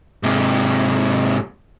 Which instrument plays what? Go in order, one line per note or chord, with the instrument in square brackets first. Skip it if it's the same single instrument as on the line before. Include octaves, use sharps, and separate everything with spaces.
[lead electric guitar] G#2 C3